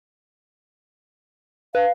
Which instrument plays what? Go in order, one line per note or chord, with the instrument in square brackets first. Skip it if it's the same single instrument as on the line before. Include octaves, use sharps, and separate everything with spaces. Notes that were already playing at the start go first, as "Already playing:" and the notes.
[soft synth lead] B4 [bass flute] F5